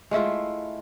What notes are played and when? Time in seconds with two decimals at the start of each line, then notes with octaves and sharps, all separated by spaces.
0.11 G#3 A3 E4 F4